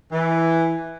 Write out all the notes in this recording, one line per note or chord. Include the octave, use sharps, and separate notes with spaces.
E3